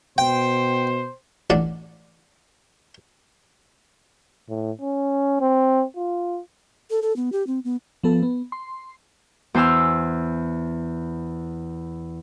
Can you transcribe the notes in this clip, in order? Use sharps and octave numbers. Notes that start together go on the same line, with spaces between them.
B2 C5 G5
A1 D4 D5 F#5
A2
C#4
C4
F4
A4
A4
B3
G4
C4
B3
F3 B3 A4
B3
C6
E2 C5 G#5 E6 F6